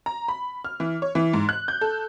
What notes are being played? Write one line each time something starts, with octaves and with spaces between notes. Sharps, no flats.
A#5
B5
F6
E3
C#5
E3
G#2
F#6
G6
A4